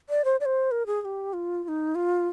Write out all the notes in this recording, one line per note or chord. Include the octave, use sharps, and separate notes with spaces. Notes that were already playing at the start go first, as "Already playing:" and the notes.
D5
C5
D5
C5
A#4
G#4
G#4
G4
F4
F4
D#4
F4